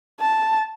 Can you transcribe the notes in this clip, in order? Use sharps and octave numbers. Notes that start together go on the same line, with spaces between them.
A5